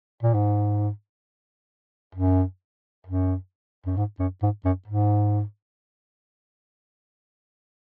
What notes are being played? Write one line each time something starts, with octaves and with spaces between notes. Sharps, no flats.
A#2
G#2
F#2
F#2
F#2
G#2
F#2
G#2
F#2
G#2